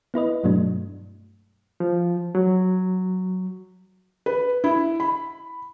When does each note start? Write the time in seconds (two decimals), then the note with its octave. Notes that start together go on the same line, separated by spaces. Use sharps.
0.14 B3 E4 B4 D#5
0.44 G2 B2 F#3 A3 D4
1.80 F3
2.35 F#3
4.26 B4
4.64 E4
5.00 B5